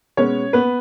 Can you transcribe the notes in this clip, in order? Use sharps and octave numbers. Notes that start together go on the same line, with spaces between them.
B2 G#3 B3 C#4 C#5
B3 B4